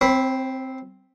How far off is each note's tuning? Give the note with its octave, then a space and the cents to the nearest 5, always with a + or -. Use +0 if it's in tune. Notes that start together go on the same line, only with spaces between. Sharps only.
C4 +0 C5 +45 B5 +0